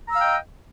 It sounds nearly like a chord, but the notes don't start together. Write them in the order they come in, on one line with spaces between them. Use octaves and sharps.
A#5 E6 F5 G5 D#5